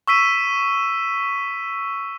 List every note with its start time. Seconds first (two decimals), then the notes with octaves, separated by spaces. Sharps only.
0.08 C#6 E6 B6 D#7